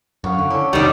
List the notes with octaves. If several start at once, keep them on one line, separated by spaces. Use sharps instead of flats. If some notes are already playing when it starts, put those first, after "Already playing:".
F#2 F5 F#5 C#6
D3
D3 C#4 E4 A5
C2 F2 D#3 G3 G#3 D#4 D5